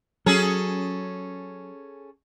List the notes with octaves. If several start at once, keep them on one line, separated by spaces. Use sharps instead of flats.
F#3 C#4 G#4 A4